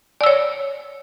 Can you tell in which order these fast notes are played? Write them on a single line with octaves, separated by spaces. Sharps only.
D5 E6 C#5